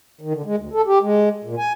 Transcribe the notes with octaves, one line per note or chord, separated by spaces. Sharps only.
D#3
D3
G#3
D2
A4
G4
G#3
A#2
G#5